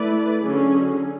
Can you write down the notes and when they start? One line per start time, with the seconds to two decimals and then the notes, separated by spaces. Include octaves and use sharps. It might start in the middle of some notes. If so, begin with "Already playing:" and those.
Already playing: A3 E4 B4 D5
0.40 D3 F#3 C#4 G#4